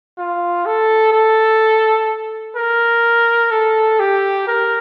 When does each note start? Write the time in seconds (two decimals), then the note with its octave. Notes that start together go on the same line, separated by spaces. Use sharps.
0.18 F4
0.66 A4
1.12 A4
2.56 A#4
3.51 A4
4.00 G4
4.48 A#4